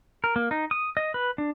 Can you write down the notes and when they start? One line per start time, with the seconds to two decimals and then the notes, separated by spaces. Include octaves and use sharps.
0.24 A#4
0.36 A#3
0.51 D#4
0.71 D#6
0.97 D#5
1.14 B4
1.38 D4